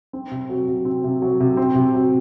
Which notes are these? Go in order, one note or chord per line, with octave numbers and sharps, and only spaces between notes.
C4
C3
F#3
C3
C4
C3
F#3
C3
C4
C3
F#3